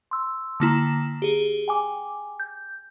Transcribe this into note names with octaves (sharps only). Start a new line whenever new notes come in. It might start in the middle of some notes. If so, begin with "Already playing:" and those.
C6 E6
D3 A#3 E4 A#5
G4 G#4
G5 G#5 D6
G6